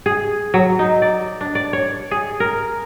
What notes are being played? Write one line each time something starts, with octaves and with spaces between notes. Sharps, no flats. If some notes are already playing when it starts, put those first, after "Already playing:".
G#4
F#3
D#4
D5
D4
D5
C#5
G#4
A#4